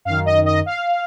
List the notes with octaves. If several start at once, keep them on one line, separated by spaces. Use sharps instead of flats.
F#2 D#3 F5
D#5
D#5
F5